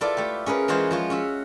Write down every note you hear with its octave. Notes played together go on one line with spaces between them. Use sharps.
E4 F4 A4 B4 D5
A3 G4
C#4 G#4 A#4 B4
E3 G#3 F4 F#4 C5 C#5
F3 F4 C#5
C#4 F#4 E5